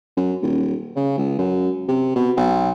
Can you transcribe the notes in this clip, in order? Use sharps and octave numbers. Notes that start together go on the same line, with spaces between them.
F#2
D#1
C#3
C#2
F#2
C3
B2
B1